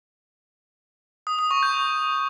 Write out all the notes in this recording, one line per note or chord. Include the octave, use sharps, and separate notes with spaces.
D#6
D#6
C#6
G6